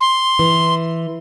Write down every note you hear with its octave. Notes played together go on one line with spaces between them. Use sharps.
C6
E3